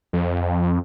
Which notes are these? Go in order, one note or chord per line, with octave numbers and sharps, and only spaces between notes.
F2